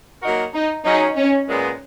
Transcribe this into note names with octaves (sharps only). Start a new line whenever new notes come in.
F#3 A#3 D#4 F#4 A#4
D#4
F#3 C#4 D#4 G#4
C#4
A#2 G#3 B3